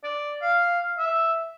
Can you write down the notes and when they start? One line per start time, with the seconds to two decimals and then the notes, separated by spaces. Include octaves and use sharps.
0.04 D5
0.42 F5
0.98 E5